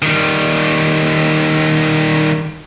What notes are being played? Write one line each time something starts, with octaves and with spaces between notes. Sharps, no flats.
D#3 G3